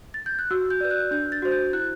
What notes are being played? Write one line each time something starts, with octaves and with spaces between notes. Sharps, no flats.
A6
G6
F#6
F#4 E6
G6
B4 D5 G6
F#6
D4 G6
A6
F#4 C5
G6
E4 F#6